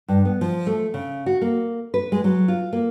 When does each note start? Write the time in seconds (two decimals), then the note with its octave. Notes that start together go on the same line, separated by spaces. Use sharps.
0.08 G2
0.25 B3
0.41 F3
0.67 A3
0.94 C#3
1.26 F#4
1.41 A#3
1.94 B4
2.12 G#3
2.24 F#3
2.48 F4
2.73 A#3